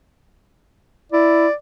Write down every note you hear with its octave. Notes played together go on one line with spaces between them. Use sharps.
E4 D5